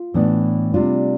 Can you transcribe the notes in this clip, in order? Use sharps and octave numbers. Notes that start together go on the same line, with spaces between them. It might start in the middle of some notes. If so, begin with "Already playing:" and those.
Already playing: F4
A2 E3 B3 D4
C3 G3 D4 F4